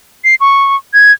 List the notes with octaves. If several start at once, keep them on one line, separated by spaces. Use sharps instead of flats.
C7
C#6
G#6